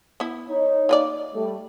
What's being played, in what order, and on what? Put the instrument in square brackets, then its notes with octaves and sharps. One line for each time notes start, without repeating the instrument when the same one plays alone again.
[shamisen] B3 E4
[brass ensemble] D#4 C#5
[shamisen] A#3 B4 D5
[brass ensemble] G3 A3